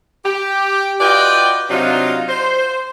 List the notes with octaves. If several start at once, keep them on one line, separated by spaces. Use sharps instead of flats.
G4
F4 F#4 B4 D5 D#5 G5
C3 F#3 D4 D#4 F4
C5